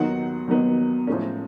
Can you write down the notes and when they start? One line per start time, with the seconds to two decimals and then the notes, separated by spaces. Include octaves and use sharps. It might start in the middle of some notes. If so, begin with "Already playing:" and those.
Already playing: D#2 D#3 F#3 B3 D#4 F#5
0.47 D#2 D#3 F#3 B3 D#4
1.07 A2 F3 G#3 C#4